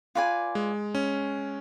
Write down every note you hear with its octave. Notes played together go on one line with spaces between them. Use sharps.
F4 B4 D5 G#5
G#3
C#4